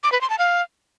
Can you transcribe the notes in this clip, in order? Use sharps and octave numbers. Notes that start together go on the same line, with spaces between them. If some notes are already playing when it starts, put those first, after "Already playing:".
D6
B4
C6
A5
F5